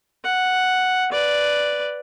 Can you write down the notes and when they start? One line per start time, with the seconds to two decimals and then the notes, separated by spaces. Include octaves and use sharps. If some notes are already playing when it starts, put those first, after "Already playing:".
0.24 F#5
1.12 B4 D5